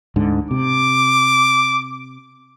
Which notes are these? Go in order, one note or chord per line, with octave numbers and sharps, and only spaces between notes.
D2 G#2 D3
C3 D6